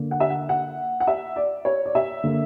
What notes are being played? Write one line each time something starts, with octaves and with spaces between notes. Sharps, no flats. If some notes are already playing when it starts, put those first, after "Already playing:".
Already playing: D3 A#3
F#5
E5
F#5
F#5
F#5
E5
D5
C#5
D5
E5
D3 A#3